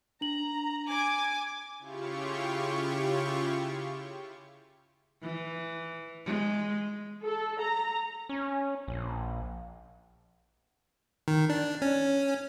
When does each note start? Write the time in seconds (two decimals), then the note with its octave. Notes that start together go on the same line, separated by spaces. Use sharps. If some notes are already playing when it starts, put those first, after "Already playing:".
0.21 D4 A#5 F#7
0.88 G#5 D6 G#6
1.79 C#3 E4 F4 G4 C#6
5.23 E3
6.25 G#3
7.24 A4
7.61 A#5
8.29 C#4
8.88 A#1
11.28 D#3
11.50 D4
11.82 C#4